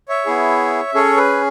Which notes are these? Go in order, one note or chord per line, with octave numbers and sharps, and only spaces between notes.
C#5 E5
B3 E4 G#4
C#4 G#4 A4 C#5
B4